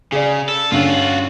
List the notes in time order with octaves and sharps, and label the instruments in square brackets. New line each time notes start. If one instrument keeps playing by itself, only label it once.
[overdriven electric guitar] C#3 [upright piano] G#4 D5
[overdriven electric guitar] A4
[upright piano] G2 D3 C#4 [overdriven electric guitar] F4 F#4